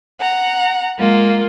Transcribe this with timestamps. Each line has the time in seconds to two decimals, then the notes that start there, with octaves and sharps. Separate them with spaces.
0.20 F#5 A#5
0.97 G#3 A#3 F4